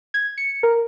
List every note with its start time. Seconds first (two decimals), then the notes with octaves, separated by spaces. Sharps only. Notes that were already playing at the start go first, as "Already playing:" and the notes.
0.14 G#6
0.38 C#7
0.63 A#4